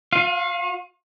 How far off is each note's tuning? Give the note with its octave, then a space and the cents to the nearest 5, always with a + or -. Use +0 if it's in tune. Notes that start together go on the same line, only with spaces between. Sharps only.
F4 +45 F5 -10